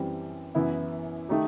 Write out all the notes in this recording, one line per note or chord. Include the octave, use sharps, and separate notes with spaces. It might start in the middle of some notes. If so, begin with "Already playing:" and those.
Already playing: F#2 E3 G3 C4
F#2 E3 B3 E4
D#3 A3 D#4 G4